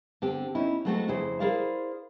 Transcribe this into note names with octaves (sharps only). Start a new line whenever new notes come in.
D3 C4 G4
C#4 D#4 E4
F#3 G#3 A3 C4 E4 F#4
F2 C#3 E4 G#4 C5
E4 G#4 A#4 C5 D5 F5